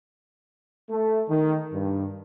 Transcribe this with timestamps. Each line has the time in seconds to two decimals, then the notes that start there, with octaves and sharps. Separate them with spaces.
0.90 A3
1.28 D#3
1.73 G2